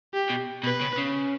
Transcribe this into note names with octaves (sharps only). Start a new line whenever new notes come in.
G4
B2
B2 B4
C#3
C#3